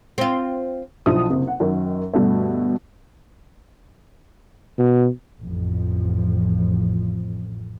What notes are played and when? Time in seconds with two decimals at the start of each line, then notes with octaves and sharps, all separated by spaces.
0.18 C4 F4
1.06 B1 F3 D4 E4 D#6
1.30 F#1 C3
1.47 F#5
1.60 F#2 D#3
2.14 G2 B2 D3 A3
4.79 B2
5.41 A1 F2 F3